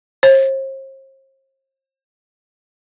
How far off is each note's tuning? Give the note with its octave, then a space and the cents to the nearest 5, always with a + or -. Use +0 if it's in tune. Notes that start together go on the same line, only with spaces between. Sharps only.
C5 +45